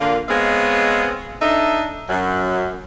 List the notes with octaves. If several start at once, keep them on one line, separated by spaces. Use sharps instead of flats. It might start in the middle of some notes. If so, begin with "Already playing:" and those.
D3 A#3 F4
G#3 B3 C4 C#5 D#5 F5
D4 D#4 A4 D#5 E5
F#2